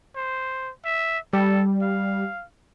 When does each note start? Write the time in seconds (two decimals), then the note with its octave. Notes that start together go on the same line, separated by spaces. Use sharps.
0.16 C5
0.85 E5
1.33 G3 A4
1.82 F5